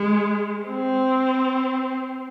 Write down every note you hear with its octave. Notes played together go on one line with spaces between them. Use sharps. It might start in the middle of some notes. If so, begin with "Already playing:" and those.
Already playing: G#3
C4